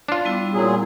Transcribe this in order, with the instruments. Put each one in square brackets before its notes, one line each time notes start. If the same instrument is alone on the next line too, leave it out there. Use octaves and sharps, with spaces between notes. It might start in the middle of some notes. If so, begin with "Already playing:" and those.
[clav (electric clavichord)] D4 F4
[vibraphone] G3 B3 E4
[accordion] A#2 F#3 G#4